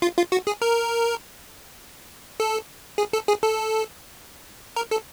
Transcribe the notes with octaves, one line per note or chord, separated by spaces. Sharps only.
F4
F4
F#4
G#4
A#4
A4
G#4
A4
G#4
A4
A#4
A4